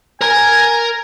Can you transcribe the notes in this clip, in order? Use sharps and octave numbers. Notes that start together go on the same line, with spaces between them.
A#4 G#5 A#5